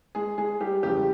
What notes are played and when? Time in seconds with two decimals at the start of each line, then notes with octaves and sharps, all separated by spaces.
0.15 G#3 G#4
0.38 G#3 G#4
0.60 G3 G4
0.83 E2 C#3 F3 G3 G#3 G4